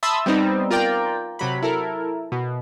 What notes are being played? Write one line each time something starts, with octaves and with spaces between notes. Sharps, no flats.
E5 A5 B5 C6 D#6 E6
G3 B3 C4 D#4
F4 A#4 D5 G5
C3 F#3 B5
E4 A4 A#4
B2